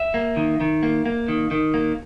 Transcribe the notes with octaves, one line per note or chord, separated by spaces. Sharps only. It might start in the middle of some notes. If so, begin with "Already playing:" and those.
Already playing: E5
A#3
D#3
D#3
A#3
A#3
D#3
D#3
A#3